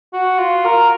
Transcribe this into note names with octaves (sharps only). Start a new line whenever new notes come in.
F#4
F4
A#4